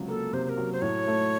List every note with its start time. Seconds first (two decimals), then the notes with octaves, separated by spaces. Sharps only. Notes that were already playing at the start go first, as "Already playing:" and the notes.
Already playing: C#2 C3 F#3
0.08 A#3 A4
0.33 C3 C5
0.44 C5
0.49 A#4
0.58 F#3
0.73 C5
0.82 A2 C#5
1.07 A3